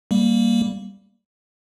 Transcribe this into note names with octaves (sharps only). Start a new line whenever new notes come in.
G3 A#3